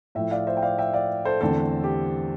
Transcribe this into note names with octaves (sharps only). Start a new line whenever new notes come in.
A2 F3 A3 E5 G5
D5 F5
C5 E5
G5
D5 F5
E5 G5
D5 F5
A4 C5
E2 D3 A3 C4 A4 C5
G4